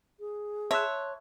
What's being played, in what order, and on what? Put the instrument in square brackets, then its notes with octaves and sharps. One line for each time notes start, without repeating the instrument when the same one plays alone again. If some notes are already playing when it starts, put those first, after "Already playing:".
[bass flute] G#4
[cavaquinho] C#5 [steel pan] E5 E6 [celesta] A5 C6 F#6